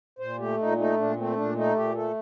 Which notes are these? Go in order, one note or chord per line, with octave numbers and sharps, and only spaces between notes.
A#2 C5
A3 G4
A#2 D#4
A3 D#4
A#2 D4
A3 C4
A#2 D4
A3 D#4
A#2 G4
A3 A4